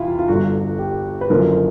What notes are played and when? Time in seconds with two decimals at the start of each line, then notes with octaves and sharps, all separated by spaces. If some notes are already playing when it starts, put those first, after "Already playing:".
Already playing: E2 C3 E4 F4
0.19 F4
0.28 G1 G2 D3 F#4
0.79 G4
1.21 B4
1.30 F#1 F#2 D3 F3 A#4